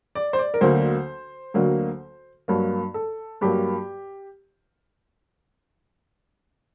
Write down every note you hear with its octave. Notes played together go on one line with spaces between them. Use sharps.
D5
C5
D5
A#4
D2 D3 F#3 A#3 C5
D2 D3 F#3 A#3
G2 F#3 A#3
A4
G2 F#3 A#3 G4